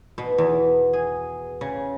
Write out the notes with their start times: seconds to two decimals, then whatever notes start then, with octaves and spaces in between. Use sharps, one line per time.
0.18 B2
0.38 E2
0.93 G#4
1.61 C#3